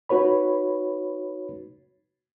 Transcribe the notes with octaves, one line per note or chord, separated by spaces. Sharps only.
D#4 F#4 B4 C#5 B5